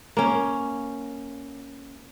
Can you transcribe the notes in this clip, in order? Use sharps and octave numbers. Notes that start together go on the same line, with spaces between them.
A#3 C#4